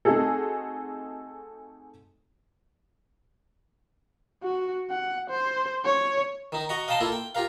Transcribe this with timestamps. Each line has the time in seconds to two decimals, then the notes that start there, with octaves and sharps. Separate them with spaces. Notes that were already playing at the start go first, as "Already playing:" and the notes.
0.05 A3 C4 D#4 F#4 G#4 A4
4.43 F#4
4.90 F#5
5.30 C5
5.85 C#5
6.52 D#3 D#4
6.69 F#4 D#5 A#5 C#6
6.88 D#5 F5 G5 A5 A#5 C6
7.00 A#3 E4 F4 A4
7.12 G5
7.35 F4 G4 A#4 F5